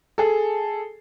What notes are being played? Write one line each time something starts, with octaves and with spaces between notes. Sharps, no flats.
G#4 A4